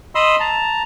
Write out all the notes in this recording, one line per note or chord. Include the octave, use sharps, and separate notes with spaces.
D#5 B5 C6 D#6 E6
A5 A#5